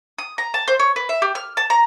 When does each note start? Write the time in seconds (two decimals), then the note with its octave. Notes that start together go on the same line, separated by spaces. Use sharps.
0.18 D#6
0.38 A#5
0.54 A5
0.68 C5
0.79 C#5
0.96 B4
1.09 E5
1.22 G4
1.35 F6
1.57 A5
1.70 A#5